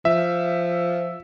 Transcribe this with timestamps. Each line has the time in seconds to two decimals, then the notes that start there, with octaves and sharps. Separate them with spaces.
0.05 F3 E5